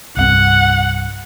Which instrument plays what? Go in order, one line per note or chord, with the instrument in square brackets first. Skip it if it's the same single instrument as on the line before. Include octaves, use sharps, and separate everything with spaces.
[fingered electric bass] C2 G2 C4 [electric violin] F#5